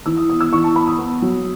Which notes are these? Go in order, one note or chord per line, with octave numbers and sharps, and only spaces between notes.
E3 E6
D#6
B3 D#6
E6
E3 C#6
A5
B3 B5
D#6
B3
F#3